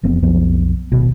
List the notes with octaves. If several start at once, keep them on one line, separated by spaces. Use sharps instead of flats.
E1 F2 B3 C4
B1 F2 F3 B3
D1 G#1 B2